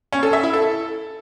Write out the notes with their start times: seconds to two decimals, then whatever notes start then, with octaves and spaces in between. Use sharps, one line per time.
0.12 C#4
0.23 A4
0.33 E5
0.43 E4
0.54 A4